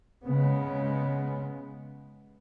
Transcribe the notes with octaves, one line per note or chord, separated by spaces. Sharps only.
C#3 G#3 B3